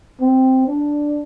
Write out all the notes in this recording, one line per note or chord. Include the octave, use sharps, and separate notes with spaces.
C4
D4